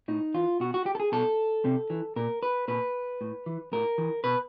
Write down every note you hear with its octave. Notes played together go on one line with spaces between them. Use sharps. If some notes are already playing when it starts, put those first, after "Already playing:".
A2 D#4
E3 F4
B2 F#4
F#4
G4
A4
G#4
B2 A4
C3
E3
A#2 A#4
B4
A#2 B4
A2
E3
A2 A#4
E3
B2 B4